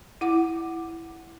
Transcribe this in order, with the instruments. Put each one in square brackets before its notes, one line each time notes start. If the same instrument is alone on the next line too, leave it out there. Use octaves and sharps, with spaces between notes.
[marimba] E4 F#5 D6